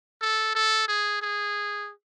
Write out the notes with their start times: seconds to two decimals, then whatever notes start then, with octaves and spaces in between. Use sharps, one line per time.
0.21 A4
0.55 A4
0.88 G#4
1.22 G#4